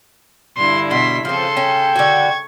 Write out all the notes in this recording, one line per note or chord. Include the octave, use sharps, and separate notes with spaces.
G2 D3 E4 C6
B2 C6 B6
C#3 F3 C4 A4 C6
C#4 G5
D3 F#4 C#6 G#6